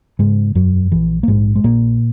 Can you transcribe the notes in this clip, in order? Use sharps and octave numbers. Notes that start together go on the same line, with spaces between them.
G#2 C#3 G#3
E1 F#2 F#3
A#1 E3
A#3
A#1 G#2 G#3
G#3
A#1 A#2 A#3